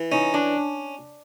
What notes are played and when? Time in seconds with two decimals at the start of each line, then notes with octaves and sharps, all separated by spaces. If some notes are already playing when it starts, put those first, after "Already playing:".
Already playing: E3
0.11 C#4 D#4
0.34 D4